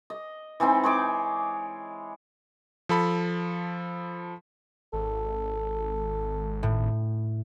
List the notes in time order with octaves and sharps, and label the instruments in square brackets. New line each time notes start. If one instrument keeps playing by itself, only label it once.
[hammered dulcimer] D#5
E3 G#3 C4 D#4
G#3 C#5 D6
[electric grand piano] F3 A4 B5
[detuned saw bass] G#1 [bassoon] A4
[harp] A2